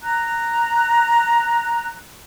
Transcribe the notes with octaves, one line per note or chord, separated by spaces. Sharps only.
A#5 F#6